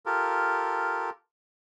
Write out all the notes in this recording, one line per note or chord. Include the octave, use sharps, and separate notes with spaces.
F4 G4 A4 A#4